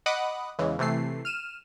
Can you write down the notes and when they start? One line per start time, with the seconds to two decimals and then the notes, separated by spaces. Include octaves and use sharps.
0.06 D#5 F#5 B5 D6 D#6 F#6
0.59 E2 C#3 E3 G#3
0.79 C3 E3 A3 C7
1.25 F6 D#7 E7